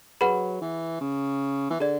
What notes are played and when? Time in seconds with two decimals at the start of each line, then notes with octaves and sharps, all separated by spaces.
0.21 F#3 G#4 B4 F#5 B5
0.61 E3
1.01 C#3
1.70 E3
1.80 D3 G#4 D5